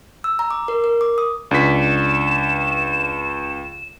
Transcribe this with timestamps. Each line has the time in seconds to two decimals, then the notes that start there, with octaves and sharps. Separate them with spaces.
0.24 E6
0.39 A#5
0.51 D6
0.68 A#4
0.84 A#4
1.01 D6
1.18 D#6
1.51 C#2 D4 B6 E7